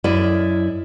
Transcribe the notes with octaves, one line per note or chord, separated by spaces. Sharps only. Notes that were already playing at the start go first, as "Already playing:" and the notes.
F#2 E4 A#4 D5 D#5